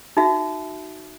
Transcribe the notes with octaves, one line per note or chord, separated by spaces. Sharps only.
D#4 F#4 E5